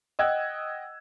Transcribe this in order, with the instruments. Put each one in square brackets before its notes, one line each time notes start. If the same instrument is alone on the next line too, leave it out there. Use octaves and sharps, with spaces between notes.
[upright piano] D#5 F#5 G5 E6 F#6 G#6